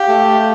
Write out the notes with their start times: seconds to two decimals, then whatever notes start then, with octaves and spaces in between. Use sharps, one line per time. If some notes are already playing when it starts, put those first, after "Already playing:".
Already playing: G4 F5
0.08 A3